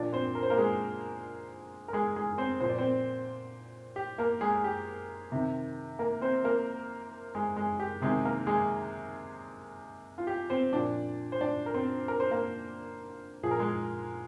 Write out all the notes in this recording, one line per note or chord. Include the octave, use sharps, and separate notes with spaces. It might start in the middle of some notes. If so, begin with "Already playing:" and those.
Already playing: A#2 F3 D4 D5
C4 C5
A#4
C5
A#3 A#4
G#3 G#4
A#4
G#3 G#4
G#3 G#4
C4 C5
A#2 F3 C5
D5
C4 C5
G4
A#3 A#4
G#3 G#4
G#4
G4
C3 D#3
A#3 A#4
C4 C5
A#3 A#4
G#3 G#4
G#3 G#4
G4
C3 D#3 G#3 G#4
A#3 A#4
G#3 G#4
F4
G4
C4 C5
A#2 F3 D4 D5
C5
D4 D5
A#4
C4 C5
A#4
C5
A#3 A#4
A#2 F3 G#4
A#4
G#3 G#4